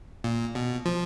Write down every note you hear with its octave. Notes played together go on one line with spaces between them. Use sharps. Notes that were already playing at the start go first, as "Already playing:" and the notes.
A#2
B2
F3